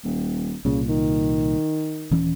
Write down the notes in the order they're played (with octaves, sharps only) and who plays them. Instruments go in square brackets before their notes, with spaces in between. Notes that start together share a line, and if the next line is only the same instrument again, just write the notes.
[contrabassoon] D#1
[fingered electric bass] C2 A#2 [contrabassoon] C#3
[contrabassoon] D#3
[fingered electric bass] D#1 E3 C#4